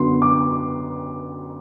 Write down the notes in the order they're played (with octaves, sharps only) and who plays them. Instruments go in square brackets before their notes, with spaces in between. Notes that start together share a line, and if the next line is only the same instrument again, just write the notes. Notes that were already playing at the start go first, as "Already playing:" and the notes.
Already playing: [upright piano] F#2 D3 F#3 B3 C6
D6